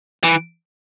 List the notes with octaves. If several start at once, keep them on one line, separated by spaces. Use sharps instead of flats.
E3